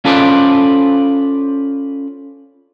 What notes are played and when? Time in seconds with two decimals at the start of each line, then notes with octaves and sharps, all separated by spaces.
0.05 C#4 F4 A4 B4 C5 D5